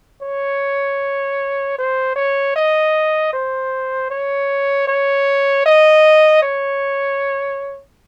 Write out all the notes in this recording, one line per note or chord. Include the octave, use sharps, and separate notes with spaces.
C#5
C5
C#5
D#5
C5
C#5
C#5
D#5
C#5